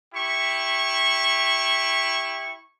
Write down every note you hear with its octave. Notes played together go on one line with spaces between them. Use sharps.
E4 G4 C#6